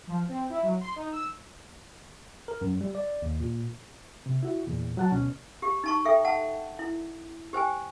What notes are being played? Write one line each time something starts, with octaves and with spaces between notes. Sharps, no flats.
F3
C4
E4
F#3
C6
D#4
E6
A#4
F#2
G3
D5
D#2
A#2
C3
E4 F#4
E2 A#2
F#3 F#5 A5
D2 B2 C#4
G4
D#4 A5 C#6
A4 E5 G5
F#5 A5
E4
G4 C5 G5 G#5